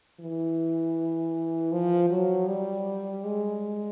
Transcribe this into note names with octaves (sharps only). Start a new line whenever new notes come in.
E3
F3
F#3
G3
G#3